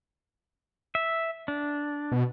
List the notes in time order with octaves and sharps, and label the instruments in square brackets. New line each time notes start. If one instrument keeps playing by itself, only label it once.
[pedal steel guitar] E5
D4
[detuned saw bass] B2